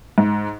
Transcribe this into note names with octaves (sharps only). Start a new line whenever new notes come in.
G#2